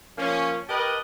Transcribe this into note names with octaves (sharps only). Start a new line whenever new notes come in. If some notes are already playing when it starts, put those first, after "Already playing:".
F3 A#3 C#4
G4 A#4 B4 D#5 A5